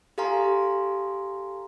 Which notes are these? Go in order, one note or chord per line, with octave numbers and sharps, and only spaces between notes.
G4 A4 F5 G#5 A#5 C6